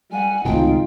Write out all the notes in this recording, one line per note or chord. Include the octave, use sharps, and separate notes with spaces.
G3 F#5 G#5
G#1 C#2 A2 C3 D#4 F4 G5